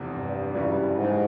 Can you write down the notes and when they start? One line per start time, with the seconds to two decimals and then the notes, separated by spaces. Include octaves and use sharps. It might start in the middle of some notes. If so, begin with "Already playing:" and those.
Already playing: F1 E2 C3
0.13 G2
0.55 F#1 F#2 C#3 E3 G3
0.96 G#2